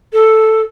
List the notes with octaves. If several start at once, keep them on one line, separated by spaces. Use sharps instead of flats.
A4